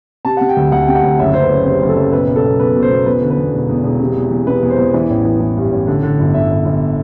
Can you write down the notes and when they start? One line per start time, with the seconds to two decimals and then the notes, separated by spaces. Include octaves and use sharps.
0.25 C3 A5
0.37 C3 F#5
0.49 G5
0.57 D2
0.72 D2 F#5
0.88 C3 G5
0.96 F#5
1.03 D2
1.19 F#1 E5
1.34 F#1 C5
1.43 B4
1.50 F#1
1.66 C3 C5
1.82 F#1
1.89 A4
1.96 F#1
2.12 B2 B4
2.28 B1
2.36 A4
2.44 B1
2.60 B2 B4
2.76 B2
2.83 C5
2.90 B2
3.06 E2 B4
3.22 D3
3.30 B4
3.37 E2
3.53 E1
3.69 E2
3.84 E1
4.00 C3
4.16 E2
4.31 E2
4.47 C3 B4
4.63 E2
4.70 C5
4.78 E2
4.94 E3 D5
5.10 A1
5.25 E3
5.40 E3
5.57 G2
5.71 A1
5.87 D3
6.03 D3
6.19 G1
6.34 G1 E5
6.50 G1
6.65 G1